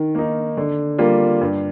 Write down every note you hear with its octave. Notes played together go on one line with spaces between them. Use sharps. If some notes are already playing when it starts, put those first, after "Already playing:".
Already playing: D#3
A#3 D#4
D3
G3 A#3 F4
G2